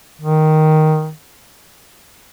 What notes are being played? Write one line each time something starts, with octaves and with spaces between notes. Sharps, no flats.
D#3